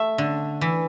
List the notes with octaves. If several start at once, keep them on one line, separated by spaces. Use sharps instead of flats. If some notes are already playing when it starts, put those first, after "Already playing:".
Already playing: A3 E5
D3
E3